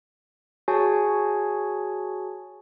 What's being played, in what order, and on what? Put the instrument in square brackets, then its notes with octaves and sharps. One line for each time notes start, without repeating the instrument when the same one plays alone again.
[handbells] F#4 G#4 C#5 G#5 A5